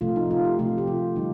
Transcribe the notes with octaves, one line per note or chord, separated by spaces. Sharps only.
C3 F3 A3 F4
D#4
F4
G4
C3 F3 A3 F4
G4
F4
D3 G3 D#4